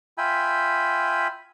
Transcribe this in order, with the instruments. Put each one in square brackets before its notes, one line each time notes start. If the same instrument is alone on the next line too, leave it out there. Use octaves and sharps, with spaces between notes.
[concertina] F4 E5 G5 G#5 B5